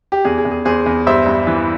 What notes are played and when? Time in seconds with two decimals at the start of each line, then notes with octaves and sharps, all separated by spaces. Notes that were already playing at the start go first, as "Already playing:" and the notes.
0.12 G4
0.25 E2 G#4
0.38 G#4
0.45 E2
0.51 G#4
0.65 E2 G#4 C5
0.86 E2
1.06 G2 C5 E5
1.26 G2
1.47 E3